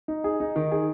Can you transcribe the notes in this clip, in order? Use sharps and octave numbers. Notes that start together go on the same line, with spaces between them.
D#4
G#4
D#4
D#3
G#4